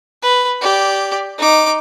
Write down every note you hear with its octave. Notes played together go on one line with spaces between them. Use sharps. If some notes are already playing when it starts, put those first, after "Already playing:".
B4
G4 D5
D#4 D6